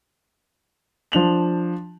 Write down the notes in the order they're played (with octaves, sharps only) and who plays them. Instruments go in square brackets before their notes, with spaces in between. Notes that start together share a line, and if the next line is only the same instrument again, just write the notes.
[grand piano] F3 D4 F7 F#7